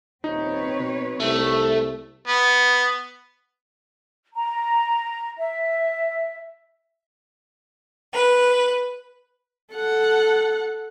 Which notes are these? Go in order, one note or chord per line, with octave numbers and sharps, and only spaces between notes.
D#1 C4 D#4 B4 C#5
B2
C2 A3
B3
A#5
E5
B4
A4 F#5